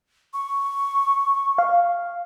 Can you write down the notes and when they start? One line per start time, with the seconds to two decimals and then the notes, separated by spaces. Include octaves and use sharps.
0.33 C#6
1.58 F5